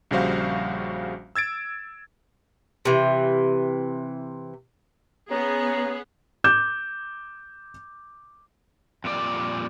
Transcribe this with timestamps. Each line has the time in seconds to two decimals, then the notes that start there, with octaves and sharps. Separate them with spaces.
0.11 A#1 C#3 G3 F#4 C5 F5
1.36 E6 G#6 A6 D7
2.85 C3 E3
5.31 B3 C#4 G#4 A#5
6.44 D6 G6 E7
9.04 F2 A#2 G3 D5